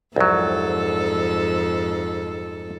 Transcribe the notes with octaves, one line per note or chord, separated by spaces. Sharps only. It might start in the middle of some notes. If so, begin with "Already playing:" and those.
C2 F2 G#2 F#3 A4